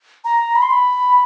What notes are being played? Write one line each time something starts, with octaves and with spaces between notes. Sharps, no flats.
A#5
B5
C6
B5